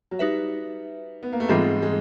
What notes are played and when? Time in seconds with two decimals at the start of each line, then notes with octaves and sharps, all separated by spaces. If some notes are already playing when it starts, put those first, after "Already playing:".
0.11 F#3
0.19 G3 D#4 F#4 B4 E5
1.23 B3
1.32 A#3
1.40 A3
1.49 G#2 E3 G3 G#3 C4 F4 A4
1.82 G#3